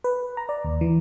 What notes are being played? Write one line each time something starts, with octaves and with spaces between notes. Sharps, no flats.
B4
A#5
D5
D#2
E3